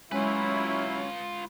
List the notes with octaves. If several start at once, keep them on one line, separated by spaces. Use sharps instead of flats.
F#3 G#3 C#4 E4 F4 B4